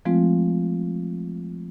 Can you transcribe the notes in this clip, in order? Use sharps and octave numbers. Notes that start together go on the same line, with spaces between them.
F3 G#3 A3 C4 F4